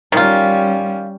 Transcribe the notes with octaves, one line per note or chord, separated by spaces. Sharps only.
D#3 G3 C#4 F4